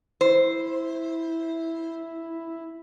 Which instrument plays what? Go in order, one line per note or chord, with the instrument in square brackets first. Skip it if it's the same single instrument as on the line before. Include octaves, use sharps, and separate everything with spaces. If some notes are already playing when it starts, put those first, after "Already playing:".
[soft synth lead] E4 [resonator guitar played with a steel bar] C5